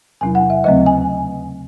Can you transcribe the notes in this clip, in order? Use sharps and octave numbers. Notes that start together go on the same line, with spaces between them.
E2 C3 F#3 C#4 E4 G#5
F#5
E5
D#2 C#3 F#3 A3 C4 D#5
G#5